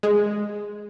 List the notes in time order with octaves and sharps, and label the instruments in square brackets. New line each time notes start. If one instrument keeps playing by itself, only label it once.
[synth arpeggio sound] G#3